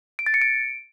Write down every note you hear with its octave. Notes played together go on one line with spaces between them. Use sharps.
D7
A6
C#7
D7